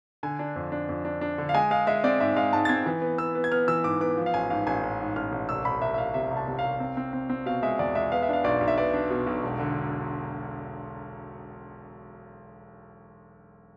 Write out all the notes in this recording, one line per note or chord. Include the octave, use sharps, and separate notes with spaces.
D3 G#5
D4
F2
D4
F2
D4
D4
D3
F5
G#3 G#5
G#3 F5
G#3 E5
C4 D5
G#2 E5
G#3 F5
G#2 A5
A6
C4 G#6
E3
B3
B3 E6
B3
G#6
B3 F6
E3 E6
G#2 D6
B3 D6
F3
F5
A1 G#5
G#2 F5
A1 G#5
A1
G#2
A1 F6
A1
C2 E6
C2 B5
C2 E5
E5
C2 F5
C3 E5
C2
A5
C3
F5
C2
C4
C4
C4
C4
B2 F5
G#3 E5
E2 D5
G#3 E5
B3 F5
E5
D4 F5
B1 D5
B1
E5
B3 D5
D4
B2
B1
E1
D3